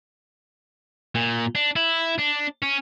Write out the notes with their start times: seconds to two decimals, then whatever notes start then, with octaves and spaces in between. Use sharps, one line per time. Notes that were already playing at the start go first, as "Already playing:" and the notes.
1.15 A#2
1.55 D4
1.76 E4
2.18 D4
2.62 C#4